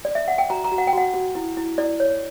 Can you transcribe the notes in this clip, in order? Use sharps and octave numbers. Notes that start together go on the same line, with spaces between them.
D5
E5
F#5
G5
F#4 A#5
A#5
F#4
F#5
G5
F#4 F#5
F#4
E4
E4
E4 D5
C#5